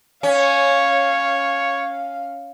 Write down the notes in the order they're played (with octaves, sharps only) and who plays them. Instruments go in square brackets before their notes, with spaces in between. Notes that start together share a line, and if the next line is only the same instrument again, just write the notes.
[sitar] C#4 [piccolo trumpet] C#5 [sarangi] F5